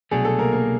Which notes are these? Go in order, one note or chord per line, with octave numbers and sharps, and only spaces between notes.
C2 B2 F#3 A3 D4 G#4
A4
A#3 A#4
A#3 A#4